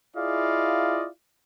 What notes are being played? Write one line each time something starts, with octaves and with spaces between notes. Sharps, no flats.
E4 F4 G#4 D5 D#5 F5